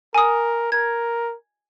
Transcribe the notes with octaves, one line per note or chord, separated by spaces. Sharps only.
A#4 G#5 D#6
A#4 G#6